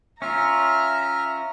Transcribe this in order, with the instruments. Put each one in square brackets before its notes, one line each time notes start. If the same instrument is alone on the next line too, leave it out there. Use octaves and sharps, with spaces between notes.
[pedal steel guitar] C#4 F4 [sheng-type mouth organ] E5 F6 [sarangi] A#5